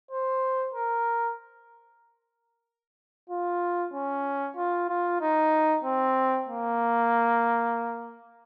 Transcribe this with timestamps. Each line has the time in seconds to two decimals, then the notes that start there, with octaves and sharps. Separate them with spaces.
0.11 C5
0.74 A#4
3.29 F4
3.93 C#4
4.56 F4
4.89 F4
5.21 D#4
5.84 C4
6.49 A#3